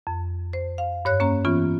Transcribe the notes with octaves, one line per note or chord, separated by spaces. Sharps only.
F2
C5
F5
G2 C#5 F#6
A#3 C#4 A#5
E3 B3 C#4 F4